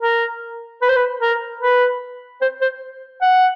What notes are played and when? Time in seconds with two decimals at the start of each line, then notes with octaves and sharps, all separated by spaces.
0.01 A#4
0.82 B4
0.89 C5
0.96 B4
1.21 A#4
1.61 B4
2.41 C5
2.61 C5
3.22 F#5